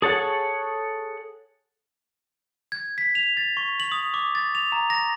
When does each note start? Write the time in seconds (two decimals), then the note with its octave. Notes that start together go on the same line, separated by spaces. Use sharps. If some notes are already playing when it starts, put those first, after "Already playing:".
0.02 G#4 A4 C#5 F#5
2.72 G#6
2.98 B6
3.15 F7
3.37 A6
3.57 C#6
3.80 F#7
3.92 D#6
4.14 D6
4.35 A6
4.55 F7
4.72 A#5
4.90 A#6